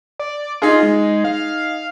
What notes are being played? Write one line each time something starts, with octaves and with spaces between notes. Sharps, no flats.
D5
D#4 F4 G#4
G#3
F5